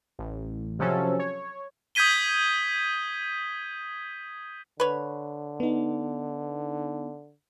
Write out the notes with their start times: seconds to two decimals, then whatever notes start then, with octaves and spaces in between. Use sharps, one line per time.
0.19 A1
0.79 C3 F3 F#3 C#4 A4
1.19 C#5
1.95 D#6 G6 G#6 B6 D#7 G7
4.80 D3 B4 C#5
5.60 B3 D#4